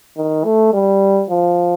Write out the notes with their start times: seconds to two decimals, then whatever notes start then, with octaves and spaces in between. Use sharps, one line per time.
0.17 D#3
0.45 A3
0.74 G3
1.30 F3